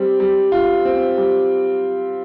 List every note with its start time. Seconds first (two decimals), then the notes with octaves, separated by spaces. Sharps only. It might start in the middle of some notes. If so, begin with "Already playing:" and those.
Already playing: G3 C4
0.20 G3
0.52 F4
0.85 C4
1.18 G3